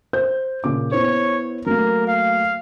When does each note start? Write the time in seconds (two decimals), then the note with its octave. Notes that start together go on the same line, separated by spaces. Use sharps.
0.13 C5 G6
0.64 A#2 C#3 D6
0.92 B3 E4 C5 C#5
1.66 F#3 A3 A#3 A#4
2.07 F5